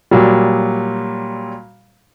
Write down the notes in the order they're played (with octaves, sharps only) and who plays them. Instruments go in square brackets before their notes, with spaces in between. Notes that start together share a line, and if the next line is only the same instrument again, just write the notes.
[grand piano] A#2 F#3 G3